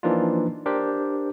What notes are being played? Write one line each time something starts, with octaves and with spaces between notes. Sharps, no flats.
E3 F3 A#3 D4 D#4 F4
D4 G4 A#4 C5